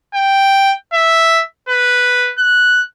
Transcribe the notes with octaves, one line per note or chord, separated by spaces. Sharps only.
G5
E5
B4
F#6